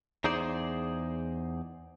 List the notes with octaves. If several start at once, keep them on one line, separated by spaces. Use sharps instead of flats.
E2 D#4 G#4 C5 D5